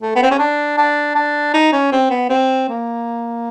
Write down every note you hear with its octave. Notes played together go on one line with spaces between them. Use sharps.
A3
B3
C4
C#4
D4
D4
D4
D#4
C#4
C4
B3
C4
A#3